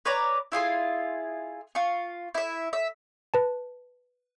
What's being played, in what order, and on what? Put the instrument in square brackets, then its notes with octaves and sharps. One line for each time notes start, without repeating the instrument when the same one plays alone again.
[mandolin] B4 C#5 D5 A#5
E4 F4 G#4 C6
F4 C#6
E4 E5
E5
[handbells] B4 A5